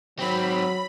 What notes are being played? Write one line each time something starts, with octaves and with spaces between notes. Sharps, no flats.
D#3 F#3 C4 B5